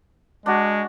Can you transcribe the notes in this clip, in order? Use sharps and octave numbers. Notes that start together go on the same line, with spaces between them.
G#3 D4 F#4